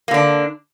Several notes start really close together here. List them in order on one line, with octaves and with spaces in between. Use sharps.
A#3 D3 D4